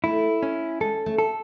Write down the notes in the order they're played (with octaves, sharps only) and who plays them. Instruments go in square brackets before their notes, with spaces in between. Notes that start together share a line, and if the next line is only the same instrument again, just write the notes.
[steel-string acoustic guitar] A3 [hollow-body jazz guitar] E4
[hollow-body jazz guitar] C#4
[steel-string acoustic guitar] G#3 [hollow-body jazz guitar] A4
[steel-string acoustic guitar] A3
[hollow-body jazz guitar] A4